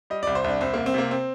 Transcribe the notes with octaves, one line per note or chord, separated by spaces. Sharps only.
G3 D#5
C2 D5
C5
C2 D4
C2 C4
C2 A#3
C4
C3 A#3
C4